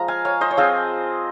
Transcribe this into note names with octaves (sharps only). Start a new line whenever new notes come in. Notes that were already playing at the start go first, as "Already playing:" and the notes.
Already playing: F3 G#3 A#5
F5 G#5
C#5 F5
C5 D#5
C#5
F3 C4 F4 G#4 C5